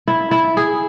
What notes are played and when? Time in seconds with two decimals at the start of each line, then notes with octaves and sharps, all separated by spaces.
0.08 E4
0.31 E4
0.57 G#4